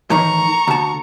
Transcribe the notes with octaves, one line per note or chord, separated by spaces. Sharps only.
A2 D#3 E3 A#5 C#6
D2 A5